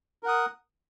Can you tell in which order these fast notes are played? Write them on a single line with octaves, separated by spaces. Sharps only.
A#4 F#5 D#6